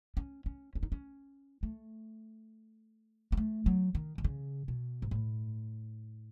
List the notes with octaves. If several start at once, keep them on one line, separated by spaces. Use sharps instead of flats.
C#4
C#4
C#4
D#4
C#4
A3
B3
A3
F#3
D#3
D#3
C#3
B2
G#2
A2